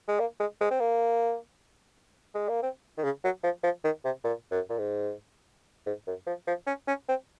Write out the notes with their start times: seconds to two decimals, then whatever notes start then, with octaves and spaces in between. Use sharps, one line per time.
0.08 G#3
0.19 A#3
0.40 G#3
0.60 G#3
0.71 C4
0.80 A#3
2.35 G#3
2.49 A#3
2.63 C4
2.98 D#3
3.04 C#3
3.24 F#3
3.43 F3
3.63 F3
3.84 D#3
4.04 C3
4.24 A#2
4.51 F#2
4.69 A#2
4.78 G#2
5.86 G#2
6.07 F#2
6.26 F3
6.47 F3
6.67 C#4
6.87 C#4
7.08 C4